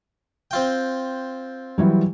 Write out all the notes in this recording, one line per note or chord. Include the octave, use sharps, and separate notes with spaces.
C4 F4 G5
E3 F#3 G3